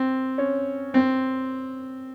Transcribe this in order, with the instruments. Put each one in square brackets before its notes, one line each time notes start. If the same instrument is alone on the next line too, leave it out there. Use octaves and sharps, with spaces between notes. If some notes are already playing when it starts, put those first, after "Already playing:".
Already playing: [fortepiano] C4
C#4
C4